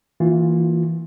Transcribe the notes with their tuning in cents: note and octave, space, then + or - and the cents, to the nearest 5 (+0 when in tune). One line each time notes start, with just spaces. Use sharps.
E3 +0 A#3 -5 F4 +20